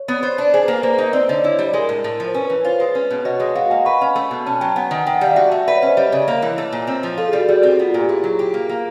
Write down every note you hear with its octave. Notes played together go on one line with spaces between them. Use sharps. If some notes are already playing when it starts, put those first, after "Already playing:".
Already playing: C#5
B3
C5
D4
G#4 C5
B4
A#3
B4
A#3 C5
D#4 D#5
C4 C5 D5
D3 C#5 D#5
E4 C#5
G3
G#3 A#4
A2
A2
F3
C5
C#4 B4
B4
E3
C#5
F4 C5
G#3 B4
C#4
B2
F#4 C#5 D#5
G#3
F#4 D#5 F5
A#3 F#5 G#5
B4 B5 C#6
C#4
A3
B2
C#4 A5
G#5
F#3 G5 A5
B3 F#5 G#5
D#3
D#3 G5
F#5
G3 F5
F#4 E5 F#5
A3
B4 D5 E5
C#5 D#5
C#4
C5 D5
G3 C#5 D#5
C#3
A#3
E3
A3
A#2
C4
F3
F4 A4
G#4
G3
F#4
G3 F#4
C4
B3 F4
F4
A#2 G4
E4 G#4
F#3
G4
A#3
A#3